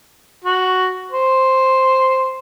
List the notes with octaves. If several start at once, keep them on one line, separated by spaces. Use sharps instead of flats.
F#4
C5